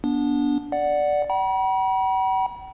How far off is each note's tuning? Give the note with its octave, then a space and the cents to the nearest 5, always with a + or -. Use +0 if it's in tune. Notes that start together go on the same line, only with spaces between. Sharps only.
B3 -20 D4 -15
D5 +0 F#5 +0
F#5 +45 B5 -45